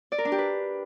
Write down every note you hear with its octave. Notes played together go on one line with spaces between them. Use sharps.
D5
A#4
D4
G4
B4